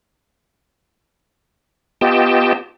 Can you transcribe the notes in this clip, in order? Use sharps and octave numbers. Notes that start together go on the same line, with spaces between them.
B3 F4 G4 D#5 G5 A5